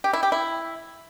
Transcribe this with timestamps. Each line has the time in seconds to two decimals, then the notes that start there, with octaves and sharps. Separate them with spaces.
0.04 G4
0.13 E4
0.23 G4
0.32 E4